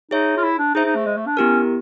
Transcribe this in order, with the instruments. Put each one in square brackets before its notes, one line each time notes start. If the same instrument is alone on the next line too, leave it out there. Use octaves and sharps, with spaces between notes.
[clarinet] D#4 [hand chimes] G#4 C#5 E5
[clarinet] F4
E4
D4
[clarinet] D#4 [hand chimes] G#4 C5 E5
[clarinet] D#4
A3
G#3
A3
D4
[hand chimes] B3 E4 G4 A#4 [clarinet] C#4